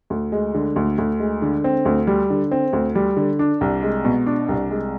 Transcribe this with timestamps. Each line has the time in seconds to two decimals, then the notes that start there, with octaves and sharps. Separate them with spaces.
0.10 D2
0.32 G#3
0.54 D3
0.76 D2
0.98 D2
1.20 G#3
1.42 D3
1.64 C4
1.85 D2
2.07 G3
2.30 D3
2.51 C4
2.73 D2
2.95 G3
3.17 D3
3.39 D4
3.61 C2
3.83 G#3
4.05 B2
4.26 D4
4.49 C2
4.70 G#3